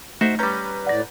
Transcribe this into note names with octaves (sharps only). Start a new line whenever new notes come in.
A3 D#4 F#4 C5 E5
G3 C#4 B4 A#5 G6
A2 D5 F#5 A#6